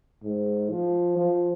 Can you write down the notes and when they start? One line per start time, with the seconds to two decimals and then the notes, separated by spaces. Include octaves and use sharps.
0.24 G#2
0.70 F3
1.17 F3